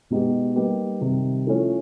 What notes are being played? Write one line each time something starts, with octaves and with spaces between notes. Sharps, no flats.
B2 G#3 B3 D#4 G4
G3 A#3 D#4 G4 B4
C3 D#3 G3
F3 A3 C#4 E4 A4